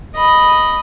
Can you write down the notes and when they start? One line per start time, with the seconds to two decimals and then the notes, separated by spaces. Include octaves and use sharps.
0.15 D#5 B5